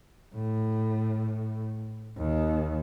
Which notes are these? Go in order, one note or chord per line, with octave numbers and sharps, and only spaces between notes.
A2
D#2